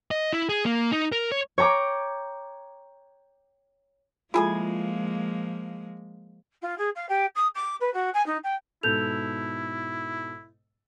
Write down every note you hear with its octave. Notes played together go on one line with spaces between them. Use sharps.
D#5
E4
G#4
A#3
D#4
A#4
C#5
C#5 G5 A#5 D6
F3 G#3 A#3 E4 F4 G#4 A4 G#5
F4
G#4
F5
G4
D#6
D6
B4
F#4
G#5
D#4
G5
G#2 B2 E4 A4 G6 F7